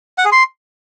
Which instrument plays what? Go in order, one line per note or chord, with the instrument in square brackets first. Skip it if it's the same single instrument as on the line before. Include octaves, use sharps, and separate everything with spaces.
[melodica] F#5
G#4
C6